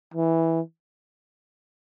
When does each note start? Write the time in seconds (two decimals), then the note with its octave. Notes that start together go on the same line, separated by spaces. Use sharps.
0.14 E3